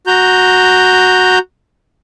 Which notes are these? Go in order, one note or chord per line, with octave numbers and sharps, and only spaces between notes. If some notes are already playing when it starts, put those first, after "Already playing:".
F#4 A#5 G6